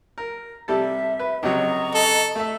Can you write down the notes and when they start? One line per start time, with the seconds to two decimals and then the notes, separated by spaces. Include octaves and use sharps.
0.18 A#4
0.68 C3 G3 A4 E5
1.19 B4
1.43 C#2 C3 F#3 D#5 A#5 C#6
1.95 A4
2.35 A3 E5